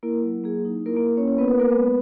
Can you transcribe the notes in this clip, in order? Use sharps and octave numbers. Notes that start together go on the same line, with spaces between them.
A#3 E4 A#4
F#3
A#3 G#4
D#4
A#3 E4 A#4
A#3 A#4
A#3
C#4 C#5
C#4 E4 C#5
B3 B4
A#4
B3 B4
A#3 A#4
G#3 B3 B4